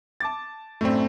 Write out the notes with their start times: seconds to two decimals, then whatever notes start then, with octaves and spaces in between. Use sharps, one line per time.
0.20 A5 D6 A6
0.81 F#2 A2 A3 C4 D4